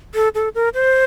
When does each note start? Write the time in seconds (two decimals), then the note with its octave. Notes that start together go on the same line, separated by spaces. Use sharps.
0.15 A4
0.35 A4
0.55 A#4
0.74 C5